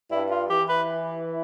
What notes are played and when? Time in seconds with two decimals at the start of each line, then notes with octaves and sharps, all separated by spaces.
0.11 G2 E4
0.31 F4
0.49 E3 G4
0.69 B4